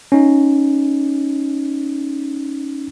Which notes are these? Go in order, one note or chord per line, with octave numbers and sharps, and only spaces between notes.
C#4 D#4